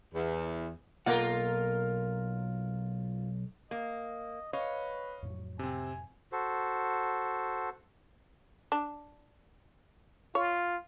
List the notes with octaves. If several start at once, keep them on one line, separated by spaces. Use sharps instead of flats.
E2
B1 A#3 F4 A#4 F#5
A#3 D#5
B4 C#5 D#5 F5
F2 A2 F#3
C3 C4 G#5
F#4 A4 C5
D4
F4 C#5